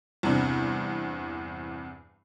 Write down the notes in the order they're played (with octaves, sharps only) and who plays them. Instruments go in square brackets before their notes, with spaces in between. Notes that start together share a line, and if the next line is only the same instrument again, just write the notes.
[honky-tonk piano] E2 G2 C3 D4